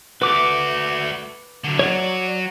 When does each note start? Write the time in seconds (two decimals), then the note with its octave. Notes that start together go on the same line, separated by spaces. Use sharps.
0.22 A3 F#4 B4 D6
1.64 D3 F#3
1.79 F#3 F#4 C#5 D5